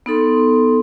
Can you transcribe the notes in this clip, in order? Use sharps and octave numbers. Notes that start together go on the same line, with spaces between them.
B3 D#4 A4 C6